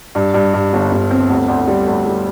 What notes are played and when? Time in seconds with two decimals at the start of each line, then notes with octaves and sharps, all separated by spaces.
0.15 G2
0.34 G2
0.54 G2
0.73 G1
0.92 G1
1.11 C4
1.29 D2
1.48 D2
1.67 G3
1.87 D2
2.06 G3